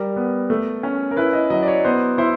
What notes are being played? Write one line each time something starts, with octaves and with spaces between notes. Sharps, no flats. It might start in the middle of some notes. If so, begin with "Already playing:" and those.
Already playing: G3 A#4
B3
A3
C#4
A#4
E4 B4
D#5
F#3 D#5
D5
C#5
B3 C5
E4 C5